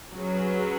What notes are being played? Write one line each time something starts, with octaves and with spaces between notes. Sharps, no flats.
F#3 C#4 G#4 B4